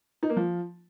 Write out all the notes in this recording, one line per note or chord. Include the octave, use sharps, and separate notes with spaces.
D#4
A#3
F3